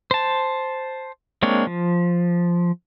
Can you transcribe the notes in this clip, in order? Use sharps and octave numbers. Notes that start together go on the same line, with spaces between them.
C5 A5
G#3 A#3 C4 D4 C#5
F3